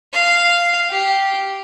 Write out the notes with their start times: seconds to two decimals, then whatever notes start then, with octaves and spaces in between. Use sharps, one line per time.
0.13 F5
0.90 G4